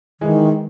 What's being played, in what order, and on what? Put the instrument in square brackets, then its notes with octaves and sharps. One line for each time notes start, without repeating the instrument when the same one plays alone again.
[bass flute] D#3 [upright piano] E3 G#3